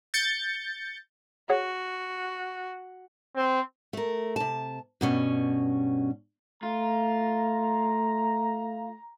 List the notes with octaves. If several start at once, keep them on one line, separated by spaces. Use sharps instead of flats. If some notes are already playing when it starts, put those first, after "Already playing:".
G6 A6 C#7
F#4 G#4 C#5 F#5
C4
A3 A#4
C3 A5
G2 B2 C#4
A3 F4 A#5